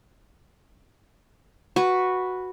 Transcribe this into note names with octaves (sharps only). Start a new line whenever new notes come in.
F#4 B4